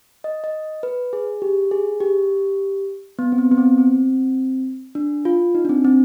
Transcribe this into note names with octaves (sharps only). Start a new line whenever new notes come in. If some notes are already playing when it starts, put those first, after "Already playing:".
D#5
D#5
B4
G#4
G4
G#4
G4
B3
C4
B3
B3
C4
C4
D4
F4
D#4
D4
C4
C4